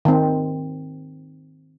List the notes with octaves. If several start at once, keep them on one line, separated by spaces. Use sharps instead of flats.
D#3 C4